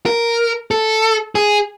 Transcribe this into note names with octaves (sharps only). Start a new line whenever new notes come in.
A#4
A4
G#4